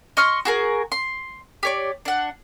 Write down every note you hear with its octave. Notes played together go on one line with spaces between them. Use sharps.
D#5 C6 C#6 F6
F#4 G#4 A#4
C6
G4 C#5 D5
D4 F#5